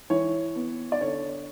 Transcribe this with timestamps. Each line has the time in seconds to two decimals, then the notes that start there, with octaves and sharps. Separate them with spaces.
0.10 E3 C#5
0.55 B3
0.92 D5
1.01 D3 C#5